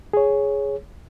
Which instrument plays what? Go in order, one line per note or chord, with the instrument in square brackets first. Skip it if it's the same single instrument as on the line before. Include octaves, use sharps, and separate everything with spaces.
[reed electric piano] G#4 C#5